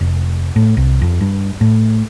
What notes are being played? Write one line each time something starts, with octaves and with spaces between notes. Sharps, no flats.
F1
A2
C2
F2
G2
A2